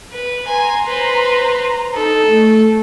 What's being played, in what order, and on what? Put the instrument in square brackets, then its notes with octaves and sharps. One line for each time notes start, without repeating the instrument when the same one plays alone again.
[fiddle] B4
[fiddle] G#5 [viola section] A#5 C6
[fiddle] B4 C5
[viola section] D#4 [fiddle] A4
[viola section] A3